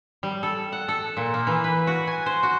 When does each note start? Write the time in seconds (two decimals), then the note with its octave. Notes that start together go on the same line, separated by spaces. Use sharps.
0.23 G3
0.43 A4
0.72 F#5
0.88 A4
1.17 A#2
1.34 A#3
1.47 E3
1.64 B4
1.87 F#4
2.07 G#5
2.26 C5
2.43 F#4